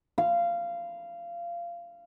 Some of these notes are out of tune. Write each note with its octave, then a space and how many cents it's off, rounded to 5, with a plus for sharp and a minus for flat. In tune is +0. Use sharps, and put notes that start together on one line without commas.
F5 -20